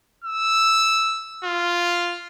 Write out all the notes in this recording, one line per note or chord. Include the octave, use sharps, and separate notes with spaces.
E6
F4